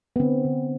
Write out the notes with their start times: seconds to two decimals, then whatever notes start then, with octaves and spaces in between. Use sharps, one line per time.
0.16 B3
0.20 D3 C4
0.45 D3